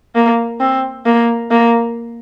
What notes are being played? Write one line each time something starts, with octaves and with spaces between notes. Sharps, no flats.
A#3
C4
A#3
A#3